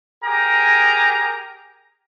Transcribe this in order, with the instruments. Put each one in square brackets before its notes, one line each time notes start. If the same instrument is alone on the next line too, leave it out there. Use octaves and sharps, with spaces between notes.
[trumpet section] G4 G#4 A#4 A#5